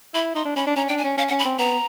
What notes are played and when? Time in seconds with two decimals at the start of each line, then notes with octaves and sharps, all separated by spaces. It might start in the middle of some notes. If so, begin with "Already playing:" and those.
0.14 E4 B5
0.35 D#4 C6
0.45 D4
0.56 C#4 B5
0.67 D4
0.76 C#4 A#5
0.89 D4 G5
0.98 G#5
1.04 C#4
1.17 C#4 F5
1.28 F#5
1.31 C#4
1.39 B5
1.45 C4
1.59 B3 A#5